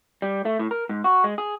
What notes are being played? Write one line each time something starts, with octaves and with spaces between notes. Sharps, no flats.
G3
A3
A2
A#4
G#2
F#4
G#3
G#4